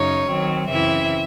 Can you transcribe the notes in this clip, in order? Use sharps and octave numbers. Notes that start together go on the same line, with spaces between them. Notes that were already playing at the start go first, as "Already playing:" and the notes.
Already playing: F#2 C#3 D#4 C#5
D#3 F#3 C4
F#2 C#3 E3 C4 E4 E5